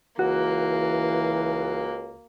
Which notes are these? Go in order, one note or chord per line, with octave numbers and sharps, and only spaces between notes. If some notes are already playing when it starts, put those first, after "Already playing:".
C#2 E3 A#3 F#4